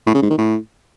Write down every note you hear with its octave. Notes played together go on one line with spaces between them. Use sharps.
A2
C#3
G#2
D#3
A2